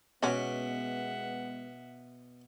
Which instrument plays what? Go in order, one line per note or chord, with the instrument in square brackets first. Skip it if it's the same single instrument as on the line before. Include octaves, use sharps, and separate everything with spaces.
[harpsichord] B2 D6 [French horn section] G#3 B3 [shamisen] C#4 F#4 [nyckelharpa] E5 F#5